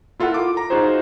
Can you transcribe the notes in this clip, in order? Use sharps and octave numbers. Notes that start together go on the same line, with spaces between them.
E4 F4 A4 A#4 F#5
D6
A#5
D#4 F4 F#4 G#4 C5